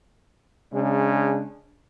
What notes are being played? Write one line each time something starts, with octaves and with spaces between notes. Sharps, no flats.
C#3 G#3 D4